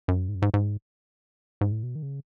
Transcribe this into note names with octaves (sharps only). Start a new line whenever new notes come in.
F#2
G#2
F#2
G#2
G#2
G#2
A2
B2
D#3
C#3